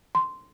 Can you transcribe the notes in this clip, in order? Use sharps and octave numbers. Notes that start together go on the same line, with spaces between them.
C6